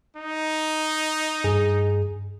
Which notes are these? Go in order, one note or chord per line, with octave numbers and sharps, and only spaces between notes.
D#4
G2 G#4